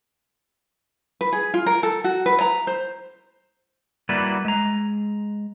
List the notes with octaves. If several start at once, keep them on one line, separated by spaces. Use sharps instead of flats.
B4
G#4
F4
A#4
A4
F#4
B4
A#5
C5
G3 A#3 E4 F#4 B4 D5
G#3 A#5